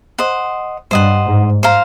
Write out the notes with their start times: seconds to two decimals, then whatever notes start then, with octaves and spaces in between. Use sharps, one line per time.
0.18 C5 D#5 F#5
0.91 G2 C5 D#5 F#5
1.27 G#2
1.63 C5 F5 A#5